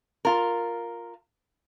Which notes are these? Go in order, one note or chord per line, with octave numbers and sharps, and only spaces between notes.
F4 A#4